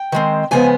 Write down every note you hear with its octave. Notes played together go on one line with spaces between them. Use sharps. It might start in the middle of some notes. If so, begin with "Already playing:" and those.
Already playing: G5
D#3 G#3 C4
C#3 F3 G#3 B3 G#5